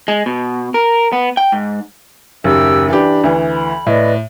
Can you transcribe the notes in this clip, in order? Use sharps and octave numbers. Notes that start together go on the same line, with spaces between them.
G#3
B2
A#4
B3
G5
G#2
F#1 D#2 G4 E5 E6
E3 D4 G4 B5
D2 E3
B5
A2 B4 D5 D#5